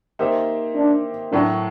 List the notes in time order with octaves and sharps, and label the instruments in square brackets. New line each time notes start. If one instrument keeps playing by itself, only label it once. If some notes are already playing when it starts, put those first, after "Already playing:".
[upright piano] A#3 D#4 G4 C5 E5
[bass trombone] D4
[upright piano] A2 F#3 A3 [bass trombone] D4